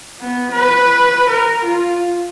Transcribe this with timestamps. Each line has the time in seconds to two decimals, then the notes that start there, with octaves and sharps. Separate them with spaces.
0.20 B3
0.51 B4
1.29 A#4
1.65 F4